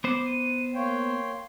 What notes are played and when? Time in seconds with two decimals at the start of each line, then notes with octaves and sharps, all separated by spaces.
0.04 B3 C5 D6
0.26 D#7
0.74 A#3 C#5 G5 C6